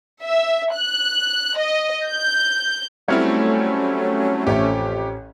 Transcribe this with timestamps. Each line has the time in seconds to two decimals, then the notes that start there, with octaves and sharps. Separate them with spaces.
0.23 E5
0.75 F#6
1.58 D#5
2.06 G6
3.08 F#3 G3 A3 C4 C#4 E4 C#5 F6
4.47 A1 F2 G4 C#5 E5